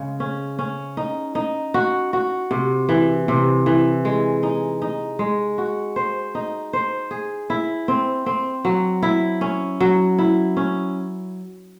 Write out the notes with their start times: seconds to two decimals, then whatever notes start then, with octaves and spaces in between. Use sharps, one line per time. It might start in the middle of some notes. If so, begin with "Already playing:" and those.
Already playing: C#3 G#3
0.20 C#4
0.59 C#4
0.97 D#4
1.35 D#4
1.74 F#4
2.13 F#4
2.51 C3
2.89 E3
3.28 C3
3.66 E3
4.05 G#3
4.43 D#4
4.82 D#4
5.19 G#3
5.58 F#4
5.96 C5
6.35 D#4
6.73 C5
7.11 G#4
7.50 E4
7.88 C4
8.26 C4
8.65 F#3
9.03 E4
9.41 C#4
9.80 F#3
10.18 E4
10.57 C#4